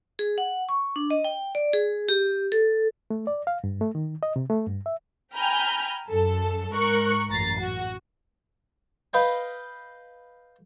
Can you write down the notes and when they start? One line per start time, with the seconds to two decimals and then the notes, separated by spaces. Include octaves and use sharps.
0.19 G#4
0.38 F#5
0.69 C#6
0.96 D4
1.10 D#5
1.24 G5
1.55 D5
1.73 G#4
2.09 G4
2.52 A4
3.10 A3
3.27 D5
3.47 F5
3.64 G2
3.81 A3
3.95 D#3
4.23 D#5
4.36 C3
4.50 A3
4.67 G2
4.86 E5
5.34 G5 G#5 A#5 B5 F6 G6
6.10 F#2 A4
6.75 G#2 A#4 C#6 F#6
7.29 A1 F#2 A#5 A6 C7
7.58 F#4
9.13 B4 D#5 F5 G5